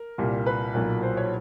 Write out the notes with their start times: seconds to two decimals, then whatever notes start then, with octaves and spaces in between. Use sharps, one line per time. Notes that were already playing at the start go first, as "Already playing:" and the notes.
Already playing: A#4
0.18 C2 A#2 G3 A#3
0.46 B4
0.74 B1 A#2 F#3
1.03 C5
1.17 C#5